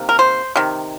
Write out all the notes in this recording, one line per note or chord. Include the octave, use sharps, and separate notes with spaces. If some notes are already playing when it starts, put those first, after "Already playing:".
Already playing: C3 D#3 A#3
A#4
C5
C3 D#3